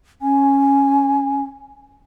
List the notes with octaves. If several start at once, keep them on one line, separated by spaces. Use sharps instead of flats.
C#4 G#5